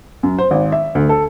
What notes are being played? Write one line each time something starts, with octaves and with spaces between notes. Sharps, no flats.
F#2
C5
G#1
E5
D2
A4